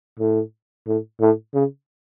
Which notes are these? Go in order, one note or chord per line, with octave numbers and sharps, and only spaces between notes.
A2
A2
A2
C#3